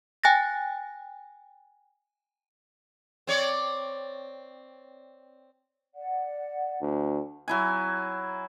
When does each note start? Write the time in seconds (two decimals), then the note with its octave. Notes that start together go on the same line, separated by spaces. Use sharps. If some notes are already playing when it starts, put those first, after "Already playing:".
0.24 G5 G#5 F#6 A6 A#6
3.27 C4 C#5 D5
5.95 D5 F#5
6.81 D2
7.48 F#3 E4 G#5